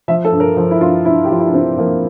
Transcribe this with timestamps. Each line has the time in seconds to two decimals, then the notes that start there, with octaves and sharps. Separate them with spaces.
0.08 F3 E5
0.25 A4
0.32 G2
0.40 A#4
0.57 F3
0.71 E4
0.81 G2 F4
1.05 G2 E4
1.25 G4
1.30 F3 F4
1.40 E4
1.47 D4
1.54 F3 C4
1.78 F3 A#3